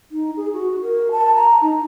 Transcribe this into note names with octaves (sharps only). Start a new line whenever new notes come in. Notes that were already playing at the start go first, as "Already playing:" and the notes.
D#4
G#4
F#4
A#4
A5
A#5
D#4